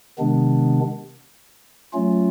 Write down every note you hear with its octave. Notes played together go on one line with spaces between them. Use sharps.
C3 D#3 G#3 B3 D4
F#3 A3 C#4 F4